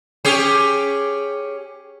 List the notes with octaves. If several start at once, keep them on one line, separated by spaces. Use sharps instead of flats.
C#4 G4 G#4